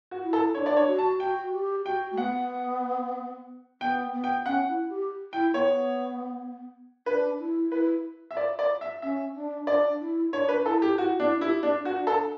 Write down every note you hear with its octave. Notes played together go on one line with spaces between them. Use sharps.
F#4
E4
A4
D4 C#5
D5
C#5
F#4
A5
F#4 G5
G4
F#4 G5
A3
B3 F#5
B3 G5
B3
G5
C#4 F#5
E4
G4
E4 G5
B3 C#5
D4 B4
E4
E4 B4
E5
D5
D5
E5
C#4 E5
D4
D4 D5
E4
D4 C#5
B4
E4 A4
G4
E4 F#4
D4 E4
E4 G4
D4
F#4
D4
A4